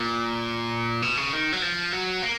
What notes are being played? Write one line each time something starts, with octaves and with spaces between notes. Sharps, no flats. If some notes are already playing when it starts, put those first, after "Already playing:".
Already playing: A#2
B2
C#3
D#3
F#3
F3
F#3
A#3